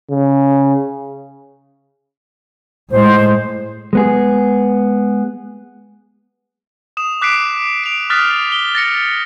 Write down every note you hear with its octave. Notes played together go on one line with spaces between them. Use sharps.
C#3
A2 G#3 C5
G#3 B3 G#4
D#6 E7
D6 F#6 B6 C7 D7
D7 F7
D#6 F6 F#6 A6 B6
G7
A6 A#6 C#7